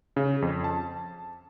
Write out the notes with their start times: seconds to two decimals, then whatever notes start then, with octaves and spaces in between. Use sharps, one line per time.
0.16 C#3
0.42 F2
0.64 A5